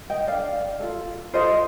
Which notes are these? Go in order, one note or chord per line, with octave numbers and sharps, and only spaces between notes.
D#5 G5
D4 A4 D5 F5
F4 A4
F4 A4 C5 D#5